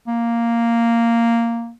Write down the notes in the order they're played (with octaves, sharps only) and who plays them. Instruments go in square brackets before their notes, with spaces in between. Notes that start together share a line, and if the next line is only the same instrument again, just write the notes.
[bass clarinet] A#3